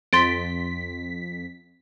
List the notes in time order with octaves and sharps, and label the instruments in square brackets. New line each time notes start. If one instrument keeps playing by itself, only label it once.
[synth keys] F2 B6 [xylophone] C6 A6 D7